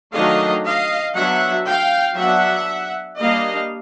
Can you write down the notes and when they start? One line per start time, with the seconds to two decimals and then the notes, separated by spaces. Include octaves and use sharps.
0.15 D#3 F#3 A3 D4 D#5 F5
0.66 D#5 F5
1.17 F#3 B3 D4 E5 F#5
1.68 F5 G5
2.19 F#3 B3 D4 E5 F#5
3.21 G3 A#3 D4 D#5 F5